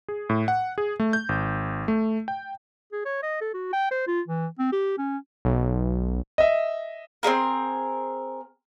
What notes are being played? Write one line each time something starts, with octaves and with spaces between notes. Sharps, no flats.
G#4
A2
F#5
G#4
A3
G6
G#1
A3
G5
G#4
C#5
D#5
A4
F#4
G5
C5
F4
E3
C4
G4
C#4
B1
D#5 E5
C4 C#4 G#4 A#4